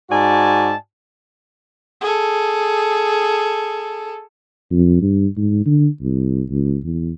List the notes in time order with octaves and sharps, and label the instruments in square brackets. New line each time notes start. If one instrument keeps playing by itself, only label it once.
[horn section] G#2 F#4 D5 G#5 A5
[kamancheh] G#4 A4
[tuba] F2
G2
G#2
D3
C2
C#2
E2